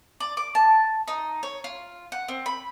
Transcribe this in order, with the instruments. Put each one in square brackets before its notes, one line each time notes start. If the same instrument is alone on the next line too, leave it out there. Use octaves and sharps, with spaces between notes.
[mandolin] D5
D6
A5
D#4
C#5
F4
F#5
C4
B5